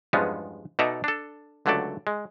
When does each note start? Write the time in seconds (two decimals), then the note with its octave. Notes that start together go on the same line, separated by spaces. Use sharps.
0.13 E2 G2 F3 G#3 B3 C#4
0.79 B2 D#4 A4 D5 E5 A#5
1.04 D4 A4
1.66 C#2 D3 F#3 A3 A4 D5
2.07 G#3